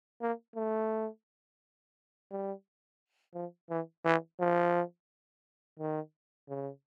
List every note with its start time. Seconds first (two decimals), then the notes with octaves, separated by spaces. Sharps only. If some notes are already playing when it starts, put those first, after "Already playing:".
0.21 A#3
0.56 A3
2.31 G3
3.35 F3
3.70 E3
4.05 E3
4.40 F3
5.79 D#3
6.49 C#3